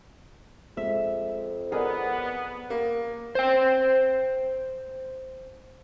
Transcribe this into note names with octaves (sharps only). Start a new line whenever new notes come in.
F2 G#3 E5
B3 G#4 A#4 D5 D#5
A#3
C5 G5